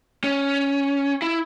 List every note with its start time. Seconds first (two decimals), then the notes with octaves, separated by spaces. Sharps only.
0.24 C#4
1.22 E4